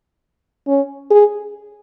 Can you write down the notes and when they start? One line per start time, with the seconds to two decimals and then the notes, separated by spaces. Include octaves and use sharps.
0.68 C#4
1.11 G#4